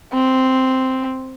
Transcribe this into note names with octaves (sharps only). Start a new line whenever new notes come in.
C4